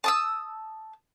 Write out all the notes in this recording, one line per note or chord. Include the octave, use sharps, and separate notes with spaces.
A5 D#6 E6